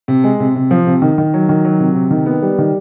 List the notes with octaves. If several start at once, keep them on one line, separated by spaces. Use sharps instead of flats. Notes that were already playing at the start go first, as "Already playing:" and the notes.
C3
G#3
C3
C3
F3
C3
D#3
D#3
F#3
D#3
F#3
C3
C3
D#3
B3
G3
D#3